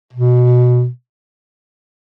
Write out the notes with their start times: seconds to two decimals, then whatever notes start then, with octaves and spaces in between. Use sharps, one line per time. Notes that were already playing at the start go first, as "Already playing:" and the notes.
0.13 B2